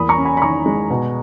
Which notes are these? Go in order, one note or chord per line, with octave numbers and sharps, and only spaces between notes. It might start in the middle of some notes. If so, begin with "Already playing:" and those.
Already playing: E2 A#3 B5 D#6
A#5 C#6
C#4
G#5 B5
B5
D#3 A#5 C#6
G#3
B2